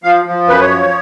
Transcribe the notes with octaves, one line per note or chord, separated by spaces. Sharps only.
F3 F5
F3
F#2 B4
C#5
F3